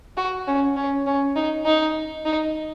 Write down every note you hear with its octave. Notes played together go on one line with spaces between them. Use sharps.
F#4
C#4
C#4
C#4
D#4
D#4
D#4